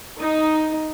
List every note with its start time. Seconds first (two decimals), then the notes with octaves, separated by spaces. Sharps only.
0.18 D#4